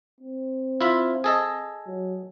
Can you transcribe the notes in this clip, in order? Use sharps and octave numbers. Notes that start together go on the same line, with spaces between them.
C4
E4 F4 E5
G#4 A4 D#5
F#3